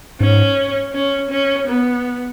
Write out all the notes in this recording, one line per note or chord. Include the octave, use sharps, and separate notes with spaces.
G#2 C#4
C#4
C#4
B3